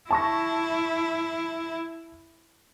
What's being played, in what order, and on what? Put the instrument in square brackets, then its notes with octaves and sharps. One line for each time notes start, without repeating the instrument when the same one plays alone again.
[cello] E4 [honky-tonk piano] A5 C#6 A#6